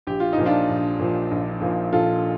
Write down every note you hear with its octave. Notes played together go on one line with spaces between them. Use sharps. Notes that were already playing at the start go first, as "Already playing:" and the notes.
A#1 G4
F4
D#4
A#2 F3
D4 F4
A#1
A#2 F3
A#1
A#2 F3
A#1 F4 A4